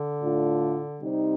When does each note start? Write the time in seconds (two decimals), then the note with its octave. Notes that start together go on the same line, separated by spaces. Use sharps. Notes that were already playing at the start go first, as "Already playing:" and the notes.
Already playing: D3
0.22 A2 A3 D4 F4
0.99 C3 G3 C4 D#4